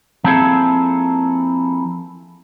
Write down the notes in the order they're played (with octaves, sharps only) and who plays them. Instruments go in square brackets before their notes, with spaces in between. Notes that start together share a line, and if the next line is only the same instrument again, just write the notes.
[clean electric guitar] F3 A#3 C4 E4 G#4 A4